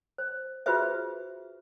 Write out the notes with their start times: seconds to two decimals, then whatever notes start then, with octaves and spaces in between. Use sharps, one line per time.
0.18 C5
0.66 F4 F#4 G#4 B4 C5 E5